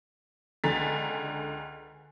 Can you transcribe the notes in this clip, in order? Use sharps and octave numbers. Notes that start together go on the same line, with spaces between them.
C#2 D3 G#5 A#5 A6 B6